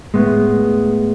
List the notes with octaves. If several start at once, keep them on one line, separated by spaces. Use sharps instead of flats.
A2 G#3 B3